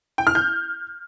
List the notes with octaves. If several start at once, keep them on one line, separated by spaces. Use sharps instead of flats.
G5
F6
G6